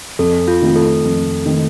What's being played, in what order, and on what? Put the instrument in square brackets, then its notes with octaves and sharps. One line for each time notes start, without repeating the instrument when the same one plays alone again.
[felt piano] F2 [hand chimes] A4
[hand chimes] F4
[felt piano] D#3 A3 C4
[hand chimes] A4
[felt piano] F2
D#3 A3 C4